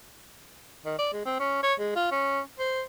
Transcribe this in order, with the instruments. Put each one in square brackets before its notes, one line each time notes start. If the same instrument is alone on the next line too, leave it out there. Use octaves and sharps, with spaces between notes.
[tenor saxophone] D#3
D5
G#3
C4
C#4
C#5
G#3
F4
C#4
C5